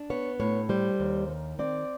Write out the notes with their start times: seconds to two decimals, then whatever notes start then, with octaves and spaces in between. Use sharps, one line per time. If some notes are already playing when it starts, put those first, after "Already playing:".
Already playing: D4
0.10 B3 C#5
0.40 A2 C#5
0.69 G3 C5
1.00 D#2
1.29 D#3
1.59 C4 D5